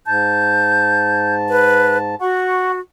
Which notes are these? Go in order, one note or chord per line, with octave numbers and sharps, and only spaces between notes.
G#2 A5 G6
B4
F#4 F#5 C#6